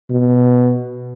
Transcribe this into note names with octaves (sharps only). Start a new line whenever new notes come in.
B2